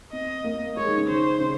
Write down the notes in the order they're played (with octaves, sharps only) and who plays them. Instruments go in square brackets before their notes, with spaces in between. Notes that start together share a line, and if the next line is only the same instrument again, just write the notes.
[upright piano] C4 [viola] D#5
[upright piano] A#3
[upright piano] G#3 [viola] C#5
[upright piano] D#3
C#3
[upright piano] D#3 [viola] C5
[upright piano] C#3